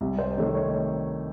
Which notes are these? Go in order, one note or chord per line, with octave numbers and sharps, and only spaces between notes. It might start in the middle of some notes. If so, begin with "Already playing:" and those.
C2
C5
C3 D#3 A3 C#5
C#5
C#5